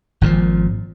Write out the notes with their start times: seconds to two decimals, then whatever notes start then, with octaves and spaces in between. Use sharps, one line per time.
0.21 G#1 A#2 D#3 F3